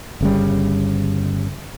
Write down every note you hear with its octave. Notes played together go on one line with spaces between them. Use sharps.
G1 C#3 G3